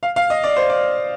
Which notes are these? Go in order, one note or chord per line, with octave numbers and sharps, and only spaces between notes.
F5
F5
D#5
D5
C5
D5